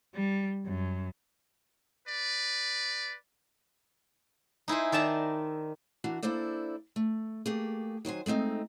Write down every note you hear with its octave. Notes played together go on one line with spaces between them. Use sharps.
G3
F#2
B4 D5
D#4 E4 G#4 C5
D#3 D5 E5 A5 A#5
E3 D4 F#4 A#4
A#3 D4 E4 A4 C5 D5
A3
A3 A#3 G4 G#4
D#3 F#3 C5 G#5
G#3 A3 C4 D#4